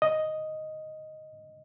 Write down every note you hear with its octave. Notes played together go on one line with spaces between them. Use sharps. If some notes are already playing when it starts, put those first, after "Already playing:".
D#5